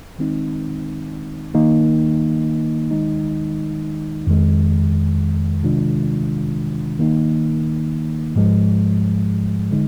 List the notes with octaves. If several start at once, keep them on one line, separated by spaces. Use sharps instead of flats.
D#3 G#3 C4 D#4
D#3 A#3 D#4
D#3 G#3 D#4
F2 D#3 G#3
C3 D#3 G#3 D4 F4
D#3 A#3 D#4
G#2 F3 G#3
D3 G#3 D#4